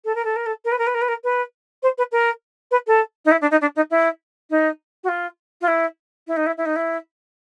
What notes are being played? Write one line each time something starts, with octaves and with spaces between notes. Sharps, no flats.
A4
A#4
A4
A#4
A4
A#4
B4
A#4
B4
A#4
B4
A#4
B4
C5
B4
A#4
B4
A4
D#4
E4
D4
D#4
D4
D#4
E4
D#4
F#4
F4
F4
E4
E4
D#4
E4
E4
D#4
E4